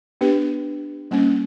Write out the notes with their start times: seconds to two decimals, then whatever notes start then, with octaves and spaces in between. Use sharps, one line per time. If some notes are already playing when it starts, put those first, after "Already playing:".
0.21 B3 D4 G4 B4
1.11 G3 A#3 C#4